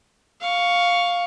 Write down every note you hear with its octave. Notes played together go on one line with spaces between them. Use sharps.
F5 C#6